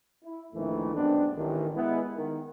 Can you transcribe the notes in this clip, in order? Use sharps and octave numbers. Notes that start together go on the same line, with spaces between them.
E4
A#1 F2 D#3 E3 A3
F#2 G#3 B3 C4 D4
A1 D#3
G#3 B3 E4
D#3